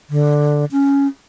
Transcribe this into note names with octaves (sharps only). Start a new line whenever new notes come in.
D3
C#4